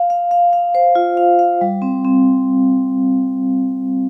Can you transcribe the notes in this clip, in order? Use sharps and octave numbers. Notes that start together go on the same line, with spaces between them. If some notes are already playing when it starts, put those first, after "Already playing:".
Already playing: F5
F5
F5
F5
C5
F4
F5
F5
G3
C4
C4